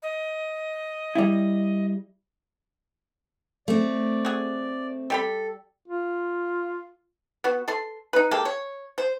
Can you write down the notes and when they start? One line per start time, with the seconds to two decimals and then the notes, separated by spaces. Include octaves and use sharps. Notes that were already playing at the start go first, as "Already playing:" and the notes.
0.02 D#5
1.15 G3 E4
3.68 A3 C4 D5
4.25 F#4 G#4
5.10 G3 G4 A4 B5
5.88 F4
7.44 B3 F#4
7.68 A4 C6
8.13 D#4 B4
8.31 G#3 A#3 G4 A4
8.45 C#5
8.98 C5